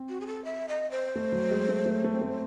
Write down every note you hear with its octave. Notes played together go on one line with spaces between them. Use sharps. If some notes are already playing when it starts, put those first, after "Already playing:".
Already playing: C4
F#4
G#4
A4
E5
D#5
C5
A3
F#3
G#3
A3
A3
A3
C4
A3